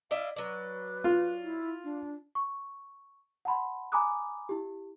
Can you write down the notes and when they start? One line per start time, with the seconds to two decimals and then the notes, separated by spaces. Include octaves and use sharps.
0.11 E4 D5 D#5 F5
0.36 F#3 B4 D5
1.04 F4
1.43 E4
1.84 D4
2.35 C#6
3.45 F#5 A5 B5 C6
3.92 G#5 A#5 B5 D6 D#6 F#6
4.49 E4 G4